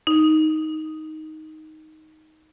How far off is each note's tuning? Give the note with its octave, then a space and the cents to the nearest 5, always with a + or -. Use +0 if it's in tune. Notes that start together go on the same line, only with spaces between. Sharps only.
D#4 +5